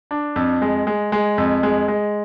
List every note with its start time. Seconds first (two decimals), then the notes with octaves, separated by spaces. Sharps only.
0.11 D4
0.36 F2
0.62 G#3
0.87 G#3
1.12 G#3
1.38 F2
1.63 G#3
1.88 G#3